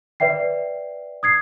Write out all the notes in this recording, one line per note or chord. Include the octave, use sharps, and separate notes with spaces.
B4 D5 E5 G5 C7
D#6 G#6 C7